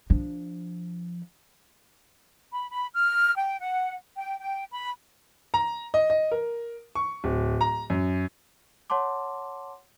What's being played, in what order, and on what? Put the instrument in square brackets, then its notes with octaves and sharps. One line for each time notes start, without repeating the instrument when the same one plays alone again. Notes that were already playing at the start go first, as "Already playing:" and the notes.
[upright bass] F3 D4
[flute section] B5
B5
F6
G5
F#5
G5
G5
B5
[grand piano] A#5
D#5
D#5
A#4
C#6
D1
A#5
F#2
[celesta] C#5 F#5 A5 C6 D6